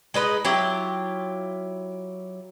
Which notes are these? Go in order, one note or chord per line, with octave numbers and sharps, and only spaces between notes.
G#3 D#4 B4 D#5
F#3 E4 F4 G4